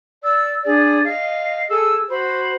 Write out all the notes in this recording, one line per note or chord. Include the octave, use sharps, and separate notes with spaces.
D5 E6
D4 G#4 D5
D#5 F5
G#4 A4 E6
F#4 C5 B5